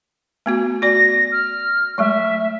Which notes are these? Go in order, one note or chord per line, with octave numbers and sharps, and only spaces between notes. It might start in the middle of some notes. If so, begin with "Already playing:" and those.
A3 B3 F#4
F#4 D5 A#6
F6
F#3 G#3 A3 E5